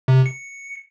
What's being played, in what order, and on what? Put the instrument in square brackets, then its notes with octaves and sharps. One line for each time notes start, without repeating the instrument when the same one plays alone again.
[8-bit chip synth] C3
C#7